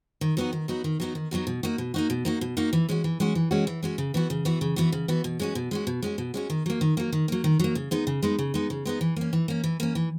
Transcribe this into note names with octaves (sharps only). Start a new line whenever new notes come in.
D#3
F#3 B3 D#4 F#4
D#3
F#3 B3 D#4 F#4
D#3
F#3 B3 D#4 F#4
D#3
F#3 B3 D#4 F#4
B2
A#3 D#4 F#4
B2
A#3 D#4 F#4
B2
A#3 D#4 F#4
B2
A#3 D#4 F#4
E3
G#3 C#4 F#4
E3
G#3 C#4 F#4
E3
G#3 C#4 F#4
E3
G#3 C#4 F#4
C#3
E3 B3 F#4
C#3
E3 B3 F#4
C#3
E3 B3 F#4
C#3
E3 B3 F#4
B2
G#3 C#4 F#4
B2
G#3 C#4 F#4
B2
G#3 C#4 F#4
B2
G#3 C#4 F#4
D#3
F#3 A#3
D#3
F#3 A#3
D#3
F#3 A#3
D#3
F#3 A#3
C#3
G#3 B3 D#4
C#3
G#3 B3 D#4
C#3
G#3 B3 D#4
C#3
G#3 B3 D#4
E3
A#3 C#4
E3
A#3 C#4
E3
A#3 C#4
E3